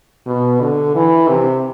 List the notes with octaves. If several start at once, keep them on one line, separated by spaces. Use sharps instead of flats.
B2
D3
E3
C3